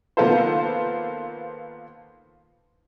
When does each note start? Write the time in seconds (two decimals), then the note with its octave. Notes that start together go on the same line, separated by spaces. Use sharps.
0.17 D#3 A#3 B3 F4 A4 C5